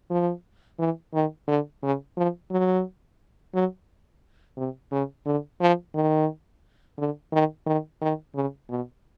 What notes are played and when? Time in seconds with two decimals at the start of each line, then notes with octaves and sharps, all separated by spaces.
0.10 F3
0.79 E3
1.14 D#3
1.48 D3
1.83 C#3
2.17 F3
2.51 F#3
3.54 F#3
4.57 C3
4.92 C#3
5.26 D3
5.61 F3
5.95 D#3
6.98 D3
7.33 D#3
7.66 D#3
8.02 D#3
8.35 C#3
8.69 B2